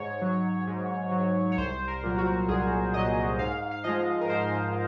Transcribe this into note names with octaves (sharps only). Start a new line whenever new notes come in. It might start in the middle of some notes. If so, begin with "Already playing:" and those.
Already playing: G#2 C#5
F#3
G#2
F#3
C#5
C2 C5
A#4
A#2 F#3
F#4
C2 G#4
A#2 F#3 D#5
G#2 F5
F5
F3 G#3 D#5
A#4
G#2 C5